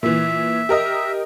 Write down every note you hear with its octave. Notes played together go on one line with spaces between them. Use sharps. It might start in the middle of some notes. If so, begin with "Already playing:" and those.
A#2 E3 E5
G4 A#4 D#5